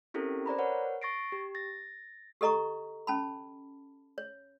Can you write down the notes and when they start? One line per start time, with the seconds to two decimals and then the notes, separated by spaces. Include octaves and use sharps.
0.14 C4 C#4 E4 G4 A4 A#4
0.46 C5 D5 A#5 B5
0.59 A#4 B4 C#5 F#5
1.02 C#6 A6 A#6 C7 D7
1.32 G4
1.55 A6 A#6
2.41 G4 A4 D#5 A#5 C#6
3.07 C#4 A5 B5
4.18 C#5